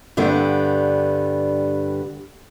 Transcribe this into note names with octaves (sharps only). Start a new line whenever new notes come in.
G2 D3 G3 B3